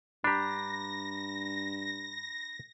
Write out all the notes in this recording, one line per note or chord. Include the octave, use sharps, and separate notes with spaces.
G2 D4 G4 A#5 B5 A#6